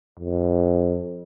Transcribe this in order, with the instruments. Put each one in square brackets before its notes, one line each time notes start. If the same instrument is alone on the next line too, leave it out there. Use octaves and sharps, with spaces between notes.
[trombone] F2